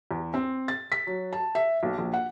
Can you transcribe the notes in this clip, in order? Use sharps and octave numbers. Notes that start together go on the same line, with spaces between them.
E2
C4
A6
B6
F#3
A5
E5
B1
A#1
F#5